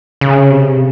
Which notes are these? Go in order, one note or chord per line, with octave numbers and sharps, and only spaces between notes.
C#3
C3